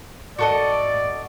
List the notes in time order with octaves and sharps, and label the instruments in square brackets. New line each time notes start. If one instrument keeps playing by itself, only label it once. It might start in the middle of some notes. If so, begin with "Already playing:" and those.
[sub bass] G#2 [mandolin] F#4 A4 D#5 [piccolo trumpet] D5